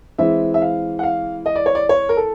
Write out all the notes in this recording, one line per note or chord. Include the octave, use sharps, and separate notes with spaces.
E3 G#3 C4 E5
E5
F5
F#5
F5
D#5
D5
C#5
D5
C#5
A#4
A4